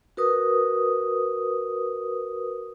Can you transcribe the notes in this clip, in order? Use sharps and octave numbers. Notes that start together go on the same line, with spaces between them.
F#4 A#4 B4 D#6